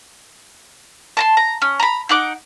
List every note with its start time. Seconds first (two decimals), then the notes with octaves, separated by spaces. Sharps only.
1.17 A5 A#5 C6
1.37 A#5
1.62 C#4
1.80 A#5 B5
2.09 D#4 F#5 D6